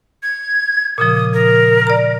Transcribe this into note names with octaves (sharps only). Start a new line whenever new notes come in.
G#6
A#2 C#3 F3 D#6
A#4
D5 A#5